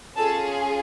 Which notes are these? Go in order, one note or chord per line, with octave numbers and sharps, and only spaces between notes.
C#4 F4 G#4 A4 A5